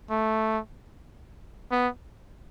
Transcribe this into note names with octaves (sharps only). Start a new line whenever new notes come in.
A3
B3